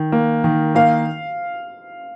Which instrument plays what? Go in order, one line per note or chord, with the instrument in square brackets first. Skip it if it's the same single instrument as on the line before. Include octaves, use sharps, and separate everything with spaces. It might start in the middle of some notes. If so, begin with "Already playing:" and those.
Already playing: [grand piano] D#3
A#3
D#3
[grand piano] A#3 [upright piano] F5